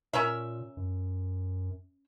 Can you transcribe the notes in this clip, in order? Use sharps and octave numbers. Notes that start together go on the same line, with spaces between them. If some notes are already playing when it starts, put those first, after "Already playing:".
A#2 C#4 A#4 E5
F#2